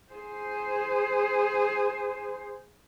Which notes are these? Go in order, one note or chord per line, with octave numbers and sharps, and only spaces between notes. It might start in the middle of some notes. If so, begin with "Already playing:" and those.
G#4 C5